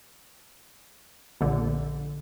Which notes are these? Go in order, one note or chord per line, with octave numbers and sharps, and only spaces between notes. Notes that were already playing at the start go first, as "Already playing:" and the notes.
A#1 D3